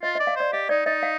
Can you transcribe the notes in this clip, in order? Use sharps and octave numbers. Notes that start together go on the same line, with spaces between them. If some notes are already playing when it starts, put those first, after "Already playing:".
F4 D#5
D#5
D5
F5
C5 D5
G4 D#5
D#4 D5
D#4 D#5
F5